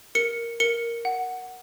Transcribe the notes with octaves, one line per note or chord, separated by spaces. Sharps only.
A#4 C#7
A#4 C#7
F#5